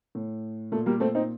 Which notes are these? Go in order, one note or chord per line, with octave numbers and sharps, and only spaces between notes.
A2
A#2 A3
G3 A#3
A3 C4
C4 D#4